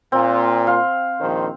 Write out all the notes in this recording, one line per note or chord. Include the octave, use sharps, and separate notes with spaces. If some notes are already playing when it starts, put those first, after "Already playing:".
A#2 C4
F5 C6
A#1 D#3 C5